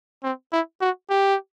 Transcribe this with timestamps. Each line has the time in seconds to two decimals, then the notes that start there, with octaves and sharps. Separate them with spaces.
0.24 C4
0.52 E4
0.81 F#4
1.10 G4